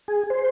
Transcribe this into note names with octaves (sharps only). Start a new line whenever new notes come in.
G#4
C5